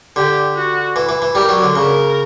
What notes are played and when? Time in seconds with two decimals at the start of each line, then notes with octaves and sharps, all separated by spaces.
0.16 D3 G4
0.56 F#4
0.96 E3
1.09 E3
1.22 E3
1.35 G3 A#4
1.49 F#3
1.62 D3
1.75 C#3 A#4